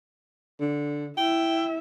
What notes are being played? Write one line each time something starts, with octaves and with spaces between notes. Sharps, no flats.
D3
E4 E5 G5